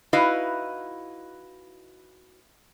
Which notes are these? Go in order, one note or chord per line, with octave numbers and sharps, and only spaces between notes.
D#4 E4 F#4 B4 D#5 F5